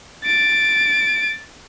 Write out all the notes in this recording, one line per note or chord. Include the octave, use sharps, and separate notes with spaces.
A6 D7